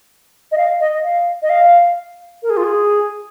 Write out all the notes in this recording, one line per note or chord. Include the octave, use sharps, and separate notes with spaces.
D#5
F5
D#5
F5
D#5
F5
A#4
G#4
F4
G#4